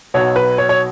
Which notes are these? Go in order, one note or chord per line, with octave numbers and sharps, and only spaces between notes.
B1 B2 F#3 C#5
B4
C#5
C#5